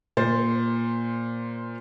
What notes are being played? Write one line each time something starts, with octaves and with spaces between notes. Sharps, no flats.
A#2 C5 A6